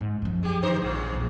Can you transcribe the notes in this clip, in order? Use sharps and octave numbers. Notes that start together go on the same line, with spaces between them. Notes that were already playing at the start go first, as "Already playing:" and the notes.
G#2
F#2 F3
G#3 G4
D3 C5
A#1 E2 G#2
A#1 F2